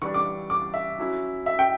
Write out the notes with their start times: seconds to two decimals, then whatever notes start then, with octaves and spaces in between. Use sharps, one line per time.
0.02 E3 G3 D4 C#6
0.14 D6
0.50 D6
0.74 E5
0.98 F#3 C#4 E4
1.46 E5
1.59 G5